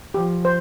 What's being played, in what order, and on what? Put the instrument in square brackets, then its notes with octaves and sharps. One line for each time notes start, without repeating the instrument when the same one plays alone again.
[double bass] F3 [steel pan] G4
[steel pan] C5